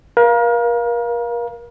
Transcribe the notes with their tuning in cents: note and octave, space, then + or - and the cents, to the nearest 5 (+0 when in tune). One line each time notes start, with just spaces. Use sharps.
A#4 +35 F5 +0